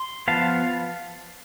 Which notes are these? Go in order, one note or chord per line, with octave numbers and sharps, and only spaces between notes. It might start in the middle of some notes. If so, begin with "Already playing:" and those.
Already playing: C6
F3 B3 F5 A5